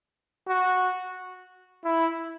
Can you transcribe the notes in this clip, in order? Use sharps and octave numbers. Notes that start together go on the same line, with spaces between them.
F#4
E4